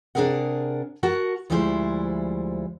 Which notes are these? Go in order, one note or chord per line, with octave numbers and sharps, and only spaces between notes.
C3 D4 D#4 G#4 A#4 F#5
F#4 A#4 F#5 A5
D2 F3 G3 G#3 E4 C5